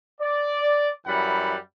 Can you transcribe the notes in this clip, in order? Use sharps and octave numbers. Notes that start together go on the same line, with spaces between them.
D5
F#2 E3 G3 F#5 B5